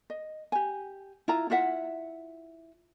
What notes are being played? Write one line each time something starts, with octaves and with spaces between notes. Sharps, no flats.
D#5
G4 G#5
E4 F4 A#5
E4 F4 E5 F#5